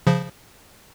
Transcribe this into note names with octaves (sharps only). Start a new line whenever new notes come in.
C#3 F3